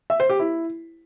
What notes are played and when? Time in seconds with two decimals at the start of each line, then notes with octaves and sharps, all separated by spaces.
0.10 E5
0.20 C5
0.30 G4
0.39 E4